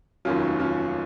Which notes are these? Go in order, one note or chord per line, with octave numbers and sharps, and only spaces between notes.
F1 D#2 D#3 F#3 C#4 F4
C#4 F4